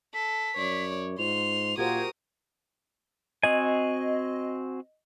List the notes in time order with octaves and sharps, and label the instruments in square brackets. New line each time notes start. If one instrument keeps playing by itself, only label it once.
[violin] A4 [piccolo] B6
[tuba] F#2 [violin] C#5 D5
[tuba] G#2 [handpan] F4 [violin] C6 [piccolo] F7
[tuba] A#2 [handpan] F#4 G4 C5 [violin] A#4 D#6 [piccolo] G#6
[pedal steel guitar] C4 F#4 G#5 [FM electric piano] D#5